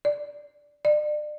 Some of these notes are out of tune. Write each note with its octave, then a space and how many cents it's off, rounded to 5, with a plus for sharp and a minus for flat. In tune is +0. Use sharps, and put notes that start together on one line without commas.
D5 -5
D5 +35